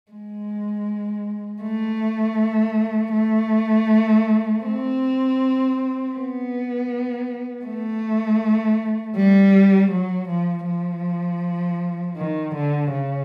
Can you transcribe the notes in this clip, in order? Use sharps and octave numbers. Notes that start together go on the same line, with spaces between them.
G#3
A3
A3
C4
B3
A3
G3
F#3
F3
F3
D#3
D3
C#3